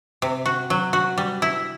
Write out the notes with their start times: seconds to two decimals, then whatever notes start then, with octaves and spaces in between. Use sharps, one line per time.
0.22 C3
0.46 F#4
0.70 F#3
0.93 F#4
1.18 G3
1.42 E4